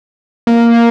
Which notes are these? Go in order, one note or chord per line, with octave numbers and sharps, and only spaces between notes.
A#3